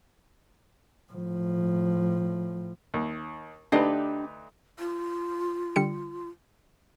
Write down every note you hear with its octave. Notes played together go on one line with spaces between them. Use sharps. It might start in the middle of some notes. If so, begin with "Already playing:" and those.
A2 F3
D#2
D2 D4 D#4 G4 B4 D#5
F4
D3 G3 C#7